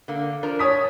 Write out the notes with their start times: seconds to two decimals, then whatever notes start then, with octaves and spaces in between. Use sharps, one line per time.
0.08 D3 A#3
0.43 F3 D4 A#4
0.59 C#5 D#6 B6
0.74 A2